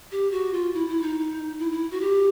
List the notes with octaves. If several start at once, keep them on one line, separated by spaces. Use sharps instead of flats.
G4
F#4
F4
E4
E4
D#4
E4
E4
F#4
G4